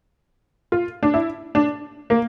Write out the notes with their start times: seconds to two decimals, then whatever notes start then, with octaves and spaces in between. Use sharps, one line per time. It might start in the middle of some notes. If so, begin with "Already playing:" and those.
0.72 F4
1.03 D4
1.14 E4
1.55 D4
2.10 A#3